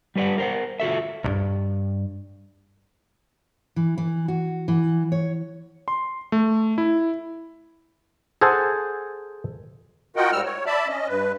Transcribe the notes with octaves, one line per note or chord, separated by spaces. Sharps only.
G3 G4 B4 D5 F#5
A#4 C5 F#5
F4 F#4 A4 E5
B1 G2
E3
E3
F#4
E3
C#5
C6
A3
E4
G#4 A4 C5 F#5 G#5 A5
F4 F#4 A#4 D#5 F#5 G5
G#2 G3 E6 F6
C#5
D5 E5 A5 B5
C#4 D#5
G2 B4